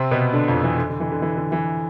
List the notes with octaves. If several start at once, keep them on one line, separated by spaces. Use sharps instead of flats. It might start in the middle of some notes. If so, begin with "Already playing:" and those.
Already playing: C3 C4
B2 B3
D3 D4
F2 F3
E3
D3
D3
E3
D3
E3
D3
E3